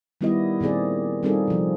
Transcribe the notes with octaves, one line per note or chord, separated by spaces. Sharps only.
D#3 G3 B3 E4 G4 D#5
A#2 D#3 C4 G#4 D5
G3 C4 D#4 F4 G#4 A4
C3 F3